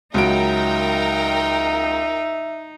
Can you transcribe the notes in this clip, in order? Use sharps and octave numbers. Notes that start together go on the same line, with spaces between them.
C#2 F#3 D#4 A#4 E5 G5 D7